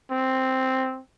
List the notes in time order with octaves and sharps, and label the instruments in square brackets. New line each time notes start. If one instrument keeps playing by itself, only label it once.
[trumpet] C4